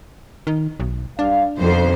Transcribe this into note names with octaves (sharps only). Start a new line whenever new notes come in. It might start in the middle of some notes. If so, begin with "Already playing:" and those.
D#3
B1
G2 D4 F5
F2 B2 D3 D#3 C5